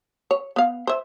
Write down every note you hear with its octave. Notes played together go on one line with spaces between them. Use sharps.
C#5
B3 F5
C5 E5